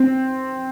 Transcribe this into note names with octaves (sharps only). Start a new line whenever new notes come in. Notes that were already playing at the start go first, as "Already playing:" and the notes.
Already playing: C4